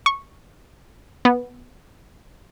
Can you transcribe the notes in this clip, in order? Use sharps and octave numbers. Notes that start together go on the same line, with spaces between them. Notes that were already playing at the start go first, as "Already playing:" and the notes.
C#6
B3